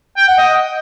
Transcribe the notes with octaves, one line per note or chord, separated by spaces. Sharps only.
G5
F#5
D#5